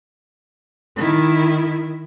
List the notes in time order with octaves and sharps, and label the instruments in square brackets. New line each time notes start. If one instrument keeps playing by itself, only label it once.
[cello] D#3 E4